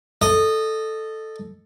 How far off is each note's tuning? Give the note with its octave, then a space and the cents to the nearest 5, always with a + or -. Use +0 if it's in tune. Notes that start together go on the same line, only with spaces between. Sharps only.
A4 +0 D#5 -15